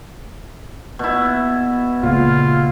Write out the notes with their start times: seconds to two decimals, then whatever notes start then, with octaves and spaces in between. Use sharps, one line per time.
0.99 B2 E4
2.03 C#2 A#2 F4